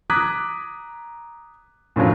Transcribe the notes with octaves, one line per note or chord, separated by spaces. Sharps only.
A#5 D6 D#6 F#6 G#6 B6
F#2 A2 D3 F3 F#3